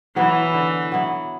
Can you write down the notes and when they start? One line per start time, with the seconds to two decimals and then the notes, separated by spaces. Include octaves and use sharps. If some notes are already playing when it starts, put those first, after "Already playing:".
0.16 E3 F#3 B3 E4
0.54 D3
0.92 F#3 B3 E4